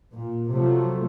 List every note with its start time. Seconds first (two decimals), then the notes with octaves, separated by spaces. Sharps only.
0.13 A#2
0.51 C3 F3 F#3 A3